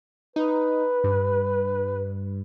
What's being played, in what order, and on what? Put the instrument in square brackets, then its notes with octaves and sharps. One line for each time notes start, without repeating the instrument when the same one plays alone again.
[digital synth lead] D#4 [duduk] B4
[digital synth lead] G2